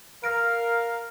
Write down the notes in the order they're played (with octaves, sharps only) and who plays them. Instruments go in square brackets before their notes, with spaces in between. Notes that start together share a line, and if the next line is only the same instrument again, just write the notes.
[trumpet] A#4 [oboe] F5 [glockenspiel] F6 A#6 D7